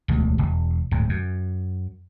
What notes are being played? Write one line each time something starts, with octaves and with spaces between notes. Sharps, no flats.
E1 D2
E1
D1 G#2
F#2